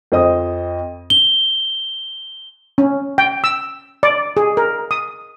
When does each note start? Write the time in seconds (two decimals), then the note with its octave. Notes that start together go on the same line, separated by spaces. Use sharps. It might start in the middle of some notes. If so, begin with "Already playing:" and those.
0.12 F2 C5 D#5 D#6
1.10 G7
2.78 C#4
3.18 G5
3.44 E6
4.03 D5
4.37 G#4
4.57 A#4
4.91 D#6